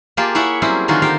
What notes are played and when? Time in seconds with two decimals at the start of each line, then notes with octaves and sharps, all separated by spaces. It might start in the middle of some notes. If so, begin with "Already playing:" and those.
0.17 A#3 F4 G4 G#4 A5
0.35 E4 G#4 C#5 E5 F#5
0.62 F#3 G3 C4 C#4 E4 G#4
0.88 D3 D#3 D#4 F4 F#4 G#4
1.02 G4 A#4 C5 F5